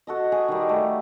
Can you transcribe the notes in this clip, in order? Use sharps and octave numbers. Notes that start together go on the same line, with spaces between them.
F#4 A4 D#5
G#4
D#3 G3
A3